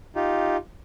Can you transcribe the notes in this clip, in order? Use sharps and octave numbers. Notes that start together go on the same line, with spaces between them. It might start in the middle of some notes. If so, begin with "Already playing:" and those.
D#4 F4 G4